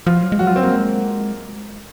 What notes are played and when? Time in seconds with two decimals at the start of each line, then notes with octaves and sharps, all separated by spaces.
0.06 F3 F4
0.23 F#3
0.32 G#3
0.39 F#3 F#4
0.47 F4
0.56 C4
0.63 A#3
0.72 G#3